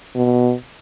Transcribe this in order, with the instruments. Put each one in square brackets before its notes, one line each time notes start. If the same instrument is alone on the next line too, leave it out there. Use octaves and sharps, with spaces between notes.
[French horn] B2